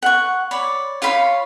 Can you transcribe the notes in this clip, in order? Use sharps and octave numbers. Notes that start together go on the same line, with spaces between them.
F#5 C#6
C#5 D5 B5
F4 C#5 F5 B5